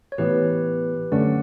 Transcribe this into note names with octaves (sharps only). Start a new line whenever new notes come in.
C#5
A2 E3 B3 G4 B4
F#2 D3 A3 C#4 D5 F#5